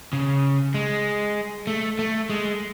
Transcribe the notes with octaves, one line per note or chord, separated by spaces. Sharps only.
C#3
G#3
A3
A3
G#3